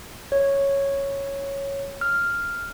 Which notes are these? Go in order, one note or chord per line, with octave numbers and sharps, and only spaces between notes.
C#5
F6